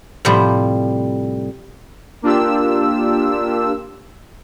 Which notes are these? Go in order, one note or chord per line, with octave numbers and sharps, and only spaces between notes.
A2 C3 F3 G3
A#3 D4 F4 G4 E6